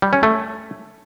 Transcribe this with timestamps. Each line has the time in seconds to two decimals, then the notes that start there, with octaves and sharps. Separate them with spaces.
0.02 G3
0.13 C#4
0.23 A3